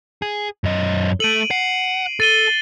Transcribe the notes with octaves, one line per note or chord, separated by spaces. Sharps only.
G#4
F#2 D#5
A3 A4 D7 D#7 F#7
F#5 C7
A4 A6 D#7 G7